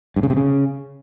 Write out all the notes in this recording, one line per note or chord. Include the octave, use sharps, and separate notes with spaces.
G2
C#3
C3
C#3